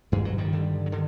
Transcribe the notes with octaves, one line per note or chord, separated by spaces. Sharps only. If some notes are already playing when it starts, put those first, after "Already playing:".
G2 G3
F#3
D#3 G3
D3
F#3
D3 D#3